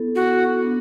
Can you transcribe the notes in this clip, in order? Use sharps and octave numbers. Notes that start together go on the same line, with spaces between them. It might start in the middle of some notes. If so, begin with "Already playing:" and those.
Already playing: B3 E4 A4
F#4
B3 D4